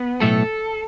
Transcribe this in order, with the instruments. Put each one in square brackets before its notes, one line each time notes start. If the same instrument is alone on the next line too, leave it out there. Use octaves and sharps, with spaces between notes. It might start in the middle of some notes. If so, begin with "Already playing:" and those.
Already playing: [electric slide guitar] B3
[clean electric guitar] B1 A2 A3 [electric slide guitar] A4